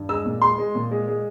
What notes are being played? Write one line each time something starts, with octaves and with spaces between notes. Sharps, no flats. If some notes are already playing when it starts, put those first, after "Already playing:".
Already playing: G2
G#3 E6
A#2
G#3 C6
G#3
A#2
G#3
G#3